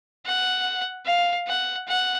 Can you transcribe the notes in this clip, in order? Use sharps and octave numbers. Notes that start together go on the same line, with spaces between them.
F#5
F5
F#5
F#5